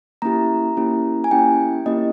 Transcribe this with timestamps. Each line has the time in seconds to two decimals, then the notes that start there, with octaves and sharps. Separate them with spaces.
0.22 A#3 C#4 E4 G4 A#5
0.77 A#3 C#4 E4 G4
1.24 G#5
1.31 A#3 C#4 E4 G4 G5
1.86 A#3 C#4 E4 G4 D#5